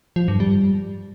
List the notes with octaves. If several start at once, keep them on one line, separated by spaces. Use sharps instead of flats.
F3
G2
G3